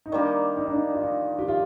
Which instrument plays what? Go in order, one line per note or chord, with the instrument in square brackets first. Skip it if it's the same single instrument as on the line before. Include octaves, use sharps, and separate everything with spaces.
[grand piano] D#4
[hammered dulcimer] D#3 G3 A#3 [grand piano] D4
[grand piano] D#4
D4
D#4
F4
D#4
G4
F4